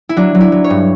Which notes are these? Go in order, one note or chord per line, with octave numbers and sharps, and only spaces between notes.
E4
F#3 D4
F#3
E4
F#3
C#5
G2